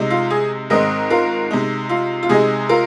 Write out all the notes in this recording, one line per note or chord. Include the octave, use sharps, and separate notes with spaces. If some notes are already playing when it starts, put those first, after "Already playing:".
Already playing: C3 G#3 D#4
F4
G#4
G#2 D#3 G#3 C4 A#4 D#5
F4 A#4
C3 G#3 D#4
F4
F4
C3 G#3 D#4 G#4
F4 A#4